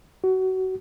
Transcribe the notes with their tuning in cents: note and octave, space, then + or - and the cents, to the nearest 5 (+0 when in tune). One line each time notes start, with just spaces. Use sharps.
F#4 +25